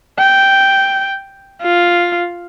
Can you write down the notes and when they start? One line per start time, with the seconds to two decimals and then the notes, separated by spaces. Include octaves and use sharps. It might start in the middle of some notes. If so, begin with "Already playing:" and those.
0.19 G5
1.62 F4